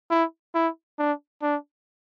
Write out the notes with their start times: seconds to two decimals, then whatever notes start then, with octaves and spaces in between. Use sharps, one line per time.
0.11 E4
0.55 E4
0.99 D4
1.42 D4